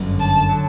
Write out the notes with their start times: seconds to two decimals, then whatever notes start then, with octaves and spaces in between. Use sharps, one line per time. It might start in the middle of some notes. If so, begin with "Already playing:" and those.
Already playing: G1 F#2 D3 F#3
0.19 A5
0.49 D3 F#3